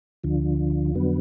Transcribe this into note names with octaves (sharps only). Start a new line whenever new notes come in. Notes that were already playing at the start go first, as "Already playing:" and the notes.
D2 D3 F3
F2 D3 F#3 B3